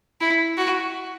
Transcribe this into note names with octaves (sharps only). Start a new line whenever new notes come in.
E4
F#4